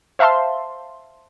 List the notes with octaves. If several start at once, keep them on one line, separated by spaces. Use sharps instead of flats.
C5 E5 F5 A5 C6